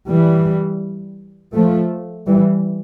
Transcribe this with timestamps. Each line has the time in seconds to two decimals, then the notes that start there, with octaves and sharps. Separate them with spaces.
0.09 E3 G3
1.54 F3 A3
2.27 E3 G3